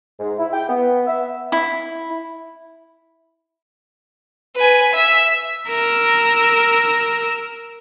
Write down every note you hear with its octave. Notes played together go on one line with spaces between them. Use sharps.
G#2
E4
G5
B3
E5
E4
B4 G#5
E5
A#4 E6